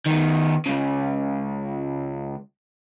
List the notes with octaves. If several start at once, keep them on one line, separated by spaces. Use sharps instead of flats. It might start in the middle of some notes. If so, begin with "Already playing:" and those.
D#3 B3
C#2 C#3